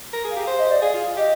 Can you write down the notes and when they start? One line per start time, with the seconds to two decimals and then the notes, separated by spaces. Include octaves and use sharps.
0.13 A#4
0.24 G#4
0.31 F5
0.36 G4
0.48 C5 F5
0.59 D#5
0.70 D5
0.82 G#4 F5
0.94 F4
1.17 G4 D#5